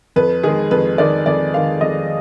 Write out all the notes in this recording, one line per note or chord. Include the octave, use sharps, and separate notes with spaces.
F2 B4
D#3 G#3 G#4
F2 B4
D#3 G#3 D5
F2 D5
D#3 G#3 F5
F2 D#5